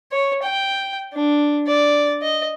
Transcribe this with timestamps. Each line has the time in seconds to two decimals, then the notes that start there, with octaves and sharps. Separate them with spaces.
0.12 C#5
0.43 G5
1.13 D4
1.67 D5
2.22 D#5